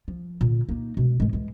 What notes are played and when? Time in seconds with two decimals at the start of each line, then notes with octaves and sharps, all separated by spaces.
0.08 F3
0.41 A#2 D3
0.69 A#3 D#4
0.97 B2 G#3
1.20 G#2 G#3
1.33 E3 G#3